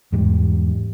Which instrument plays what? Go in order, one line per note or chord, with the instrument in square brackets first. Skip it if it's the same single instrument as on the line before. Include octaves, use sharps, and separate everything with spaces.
[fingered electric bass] E2 G#2 G3